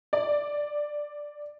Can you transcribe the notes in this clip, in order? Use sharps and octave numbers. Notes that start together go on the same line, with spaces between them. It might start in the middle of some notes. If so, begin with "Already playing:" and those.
D5